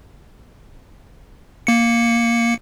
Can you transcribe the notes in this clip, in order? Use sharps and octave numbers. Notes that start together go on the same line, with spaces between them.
A#3 C#7